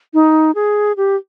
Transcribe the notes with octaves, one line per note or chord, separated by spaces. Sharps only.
D#4
G#4
G4